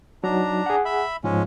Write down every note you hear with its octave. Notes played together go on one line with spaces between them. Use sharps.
F#3 D4 D#4 A#5
G#4 F#5
E5 B5
G#2 F3 G#3 C#4